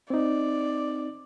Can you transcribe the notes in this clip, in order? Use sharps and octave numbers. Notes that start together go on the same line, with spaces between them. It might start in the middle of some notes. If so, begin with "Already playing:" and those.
C4 D#4 D5